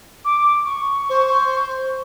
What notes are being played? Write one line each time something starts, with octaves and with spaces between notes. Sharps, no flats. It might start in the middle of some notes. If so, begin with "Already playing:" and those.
D6
C#6
C5